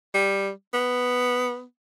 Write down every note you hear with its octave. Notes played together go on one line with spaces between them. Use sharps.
G3
B3